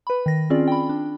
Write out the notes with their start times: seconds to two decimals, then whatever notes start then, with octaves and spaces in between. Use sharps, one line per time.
0.07 B4 B5
0.26 D#3 A#6
0.50 C4 C#4 F4 G#4 D5
0.68 G5 B5
0.89 D4